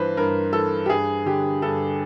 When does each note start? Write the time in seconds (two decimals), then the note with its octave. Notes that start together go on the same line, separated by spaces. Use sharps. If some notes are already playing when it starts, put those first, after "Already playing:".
Already playing: G2 E3 B4 C5
0.17 G2 A#4
0.53 E3 A4
0.86 G4
0.89 G2 G#4
1.26 D3 G4
1.62 G2 A4